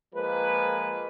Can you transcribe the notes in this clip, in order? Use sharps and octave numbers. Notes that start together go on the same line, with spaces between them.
F3 G#3 A#3 B4